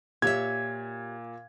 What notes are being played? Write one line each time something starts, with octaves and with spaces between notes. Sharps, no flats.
A#2 G4 C#5 E5 G#6